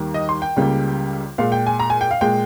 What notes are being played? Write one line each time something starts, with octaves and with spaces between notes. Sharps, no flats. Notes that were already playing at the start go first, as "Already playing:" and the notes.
Already playing: D#2 D#3 G3 A#3
D#5
C6
G5
C#2 C#3 G3 A#3
A#2 G#3 F5
G5
G#5
A#5
G#5
G5
F5
A#2 G#3 G5